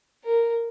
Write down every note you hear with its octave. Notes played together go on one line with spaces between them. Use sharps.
A#4